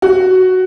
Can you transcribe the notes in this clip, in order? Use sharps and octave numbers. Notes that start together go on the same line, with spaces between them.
F#4